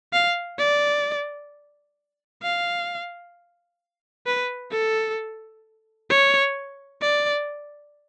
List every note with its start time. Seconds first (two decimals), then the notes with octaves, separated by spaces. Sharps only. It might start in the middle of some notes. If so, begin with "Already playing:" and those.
0.13 F5
0.59 D5
2.43 F5
4.26 B4
4.72 A4
6.10 C#5
7.02 D5